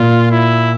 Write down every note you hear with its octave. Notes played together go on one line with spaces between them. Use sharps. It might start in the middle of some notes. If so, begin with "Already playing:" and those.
Already playing: A#2 F4
E4